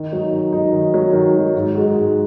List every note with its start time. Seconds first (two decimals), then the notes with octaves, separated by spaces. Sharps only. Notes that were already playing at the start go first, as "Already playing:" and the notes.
Already playing: D#3
0.12 F#3 D#4
0.32 D#3
0.53 F#3 D#4
0.73 D#3
0.94 F#3 D#4
1.13 D#3
1.34 F#3 D#4
1.54 G#2
1.75 G#3 D#4 F#4
1.94 G#2